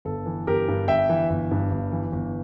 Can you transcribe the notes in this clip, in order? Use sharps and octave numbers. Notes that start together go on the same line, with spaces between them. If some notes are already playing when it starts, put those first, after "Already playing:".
G1 A4
E3
G1 G4 A#4
G2
G1 E5 G5
E3
G1
G2
G1
E3
G1